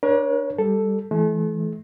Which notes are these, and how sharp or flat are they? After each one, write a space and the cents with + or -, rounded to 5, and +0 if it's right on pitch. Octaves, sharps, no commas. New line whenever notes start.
D4 +0 A#4 +45 C#5 +0
G3 +10 A4 +0
E3 +0 A3 -40